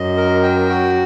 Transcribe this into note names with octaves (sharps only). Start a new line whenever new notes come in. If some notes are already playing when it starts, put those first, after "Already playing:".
Already playing: F#2 D#5
A#4
G5
F#4